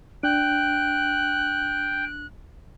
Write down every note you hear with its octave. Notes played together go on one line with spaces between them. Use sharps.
D4 G5 F#6